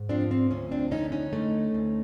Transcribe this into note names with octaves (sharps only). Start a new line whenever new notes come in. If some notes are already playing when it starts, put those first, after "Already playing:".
Already playing: G#2
F3 C4 D4
C4
D2 C#4
C4 D4
D3 C#4 D#4
C#4 D#4
A3
D2